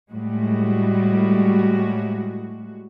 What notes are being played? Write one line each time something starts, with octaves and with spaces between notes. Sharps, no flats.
A2 G3 G#3 F#4